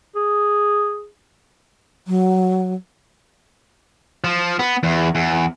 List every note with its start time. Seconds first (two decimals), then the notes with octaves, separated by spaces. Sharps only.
0.16 G#4
2.07 F#3
4.24 F3
4.59 B3
4.83 E2
5.15 E2